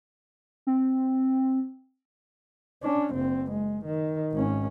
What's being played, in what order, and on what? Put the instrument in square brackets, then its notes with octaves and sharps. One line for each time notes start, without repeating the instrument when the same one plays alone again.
[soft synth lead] C4
[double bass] C#4 D4
F#1 C4
G#3
D#3
G#1 C#4